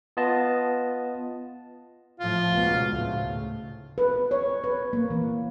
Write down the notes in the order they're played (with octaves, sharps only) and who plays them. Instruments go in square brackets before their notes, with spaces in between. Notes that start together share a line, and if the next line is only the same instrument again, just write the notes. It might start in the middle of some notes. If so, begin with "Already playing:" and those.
[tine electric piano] B3 F4 D#5 A5
[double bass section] A2 F3 [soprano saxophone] F4
[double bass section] C#2 G#2 B2
D2 A2 C#3
[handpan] B4
C#5
B4
A#3
E3